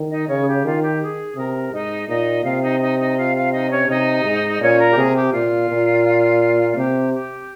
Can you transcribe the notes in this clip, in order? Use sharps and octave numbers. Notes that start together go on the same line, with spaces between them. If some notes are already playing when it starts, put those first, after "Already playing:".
Already playing: D#3
D#4 D#5
C#3 C#4 C#5
G#4
G4
D#3 F4
G4
G#4
C3 A#4
G#2 D#4 D#5
A#2 D#4 D#5
C3 F4 F5
D#4 D#5
D#4 D#5
D#4 D#5
F4 F5
F4 F5
D#4 D#5
C#4 C#5
C3 D#4 D#5
G#2
D#5
A#2 C#4 C#5
A#4
G4
C3 G#4
G4
A#2 F4
A#2
F4
C3 G4
G4